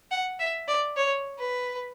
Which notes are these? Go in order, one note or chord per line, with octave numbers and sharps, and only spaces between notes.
F#5
E5
D5
C#5
B4